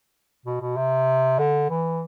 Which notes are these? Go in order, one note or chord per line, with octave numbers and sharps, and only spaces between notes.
B2
B2
C3
D3
E3